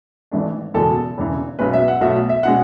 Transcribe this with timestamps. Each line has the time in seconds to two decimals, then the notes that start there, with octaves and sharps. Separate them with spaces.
0.31 G#1 G#2 E3 A3 D4
0.74 F#1 E2 B2 G#3 A4
1.17 E1 E2 C#3 E3
1.59 B1 B2 G#3 C#4 B4
1.73 E5
1.88 F#5
2.01 B1 B2 A3 E5
2.29 E5
2.43 B2 G#3 C#4 F#5